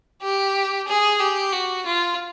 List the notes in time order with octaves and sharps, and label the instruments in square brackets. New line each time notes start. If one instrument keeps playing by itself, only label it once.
[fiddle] G4
G#4
G4
F#4
F4